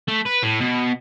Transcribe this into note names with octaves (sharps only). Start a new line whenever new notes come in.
A3
B4
A2
B2